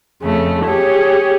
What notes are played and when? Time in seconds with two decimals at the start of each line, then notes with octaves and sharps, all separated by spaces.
0.21 F2 C#3 A3
0.65 G4 G#4 C#5